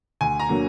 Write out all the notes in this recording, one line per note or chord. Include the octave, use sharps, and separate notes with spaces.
D2 G#5
A#5
D3 F#3 A#3